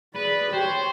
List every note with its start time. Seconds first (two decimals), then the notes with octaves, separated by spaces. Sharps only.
0.15 G#4 B4 D5 B5
0.53 G4 C5 C#5 G5